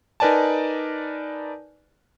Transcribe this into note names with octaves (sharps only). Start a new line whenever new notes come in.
D#4 A#4 B4 D5 G#5 A5